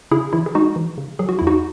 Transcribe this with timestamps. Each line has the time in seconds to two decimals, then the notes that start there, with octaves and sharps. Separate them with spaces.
0.11 C#3 E4 G#4
0.33 E3 E4
0.46 G#4
0.55 G#3 D#4 F#4
0.76 E3
0.98 C#3
1.19 F#3 G#4
1.29 F#4
1.39 E2 E4
1.47 D#4 F#4